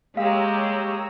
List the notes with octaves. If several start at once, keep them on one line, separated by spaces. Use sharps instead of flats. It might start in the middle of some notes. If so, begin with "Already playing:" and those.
G#3 A#3 G4 C#5 F5 A#5 E6